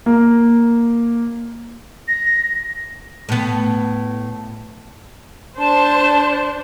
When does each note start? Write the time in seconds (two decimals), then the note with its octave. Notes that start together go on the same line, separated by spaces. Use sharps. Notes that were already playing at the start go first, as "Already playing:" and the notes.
0.06 A#3
2.08 A#6
3.29 A2 B3
5.58 D4 C5 A5